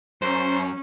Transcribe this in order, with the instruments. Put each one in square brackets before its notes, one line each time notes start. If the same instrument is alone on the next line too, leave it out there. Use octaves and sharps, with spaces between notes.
[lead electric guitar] F#2 [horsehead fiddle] C#4 [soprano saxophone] C5